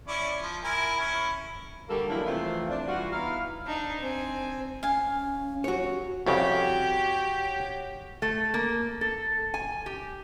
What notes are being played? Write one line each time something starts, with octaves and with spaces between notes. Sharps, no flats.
C#4 E4 D5
F3
E4 A#4 G#5
C#4 E4
D3 G3 A#3 F#4 A4 A#4
E3 F#3 G#3 A#3 D4 E4
C3 E3 F3 A3 F4 C5
D4
E3 G3 F4 F#4
B3 D#4 E4 F5
D4 D#4
C4 G#5
C#4 F5 G#5
F#4 G4 C#5
C2 F2 C#3 F#4 G4 C#5
A3
A#3
A4
G#5
G4